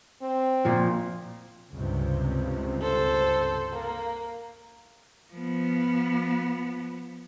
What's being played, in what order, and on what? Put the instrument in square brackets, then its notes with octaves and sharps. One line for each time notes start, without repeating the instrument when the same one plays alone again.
[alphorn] C4
[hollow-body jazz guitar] A#2 F3
[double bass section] C#2 G2 C3
[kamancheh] A4 C5
A#3
[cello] F3 B3